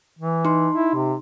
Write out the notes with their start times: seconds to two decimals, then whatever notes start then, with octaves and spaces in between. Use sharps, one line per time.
0.19 E3
0.45 D#4 C6
0.73 E4
0.94 C3